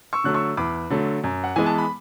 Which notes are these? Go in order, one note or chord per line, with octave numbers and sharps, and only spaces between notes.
C#6 E6
D3 F#3 A3 F#6
C#6 E6
E2 B5 D6
D3 F#3 A3
F#2
F#5
E3 G#3 B3 G#5
A5
B5